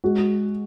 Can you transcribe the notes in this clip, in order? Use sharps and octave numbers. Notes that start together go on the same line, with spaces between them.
G#3 F#4